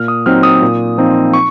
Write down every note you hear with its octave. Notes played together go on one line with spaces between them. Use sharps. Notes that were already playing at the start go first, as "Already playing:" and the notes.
Already playing: A#2 F6
D#6
F#3 C4 D#4 F6
D#6
A#2
F3 C4 D#4
C#6